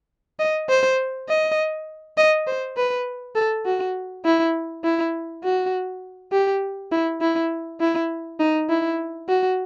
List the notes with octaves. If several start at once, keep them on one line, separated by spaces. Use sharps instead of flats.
D#5
C5
D#5
D#5
C5
B4
A4
F#4
E4
E4
F#4
G4
E4
E4
E4
D#4
E4
F#4